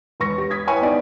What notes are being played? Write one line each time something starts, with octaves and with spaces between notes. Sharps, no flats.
E1 B4 C#6 A#6
G4
D#6 G#6 B6
E4 B4 C#5 G5 G#5 C#6
B3 D#4 D5